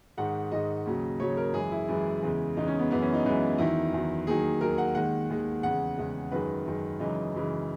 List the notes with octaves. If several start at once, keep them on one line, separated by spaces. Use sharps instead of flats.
G#2 D#3 G#3 F#5
G#2 D#3 G#3 D#5
D#2 C#3 F#3
D#2 C#3 F#3 C#5
A#4
F#2 E3 G#3 G#4
E4
F#2 E3 G#3
E2 C#3 G#3
E2 C#3 G#3 D#4
C#4
B3
F#2 E3 G#3 B3
C#4
D#4
F#2 E3 G#3
E2 D#3 F#3 E4
E2 D#3 F#3
D#2 D#3 F#3 G#4
D#2 D#3 F#3 A#4
F#5
D#2 D#3 G#3 F#5
D#2 D#3 G#3
E2 C#3 G#3 F#5
E2 C#3 G#3
F#2 D#3 G#3 B4
F#2 D#3 G#3
F#2 C#3 E3 G#3 D#4
F#2 C#3 E3 G#3